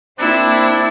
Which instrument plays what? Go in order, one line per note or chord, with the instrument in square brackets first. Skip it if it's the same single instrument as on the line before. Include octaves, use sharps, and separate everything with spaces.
[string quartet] A#3 C4 [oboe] D4 [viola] E4